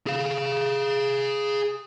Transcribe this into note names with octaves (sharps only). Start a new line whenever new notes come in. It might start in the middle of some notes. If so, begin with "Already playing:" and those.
G#4 F5